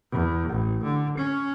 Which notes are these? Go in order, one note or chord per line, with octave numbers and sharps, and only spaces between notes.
E2
A1
D3
C#4